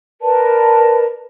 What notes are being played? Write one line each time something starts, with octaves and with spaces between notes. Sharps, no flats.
A#4 B4 D5 A5